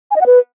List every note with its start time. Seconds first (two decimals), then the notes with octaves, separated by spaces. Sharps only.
0.11 G#5
0.16 D#5
0.21 F#5
0.26 B4